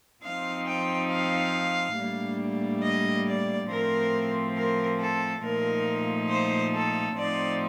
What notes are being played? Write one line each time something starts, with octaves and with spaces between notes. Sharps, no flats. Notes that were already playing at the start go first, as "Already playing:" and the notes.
F3 C4 D#4 F5
G5
F5
A2 G3 A#3 D4
D#5
D5
A2 F3 C4 A#4
A#4
A4
A#2 F3 A3 D#4 A#4
C5
A4
A2 F3 C4 D#4 D5